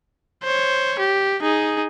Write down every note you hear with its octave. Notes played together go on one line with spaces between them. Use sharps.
C5 C#5
G4
D#4 G#4